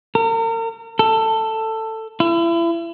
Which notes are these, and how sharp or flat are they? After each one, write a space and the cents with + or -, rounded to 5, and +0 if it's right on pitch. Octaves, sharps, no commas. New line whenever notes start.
A#4 -40
A4 +15
E4 +35